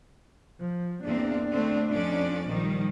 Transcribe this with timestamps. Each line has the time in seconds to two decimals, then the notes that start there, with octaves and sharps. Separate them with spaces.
0.60 F3
1.04 E2 A#3 C4 D4
1.52 D3 A3 C4
1.90 F2 C#4 D5
2.48 A#1 D#3 F3 G3